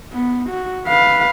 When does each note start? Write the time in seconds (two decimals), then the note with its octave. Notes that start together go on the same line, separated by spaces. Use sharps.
0.12 B3
0.49 F#4
0.87 B4 F5